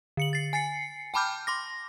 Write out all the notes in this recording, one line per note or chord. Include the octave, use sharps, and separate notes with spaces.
D3 C#7 F#7
A6 C7
G#5 A6 C7 C#7
G5 A5 B5 D6 F6 G6
C6 D6 A#6